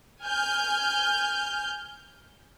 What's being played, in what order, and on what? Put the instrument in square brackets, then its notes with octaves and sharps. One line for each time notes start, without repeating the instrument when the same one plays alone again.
[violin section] G#5 F6 G6